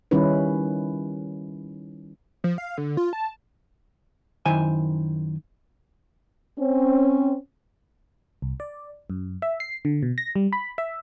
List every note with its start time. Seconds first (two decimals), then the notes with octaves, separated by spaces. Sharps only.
0.11 D#3 G3 C#4 D#4 E4 B4
2.44 F3
2.58 F5
2.78 D3
2.97 F4
3.13 A5
4.46 F#2 D#3 E4 C5 G#5
6.59 C4 C#4
8.42 C2
8.60 D5
9.10 F#2
9.42 E5
9.60 C7
9.85 D3
10.03 B2
10.18 A#6
10.36 G3
10.53 B5
10.78 E5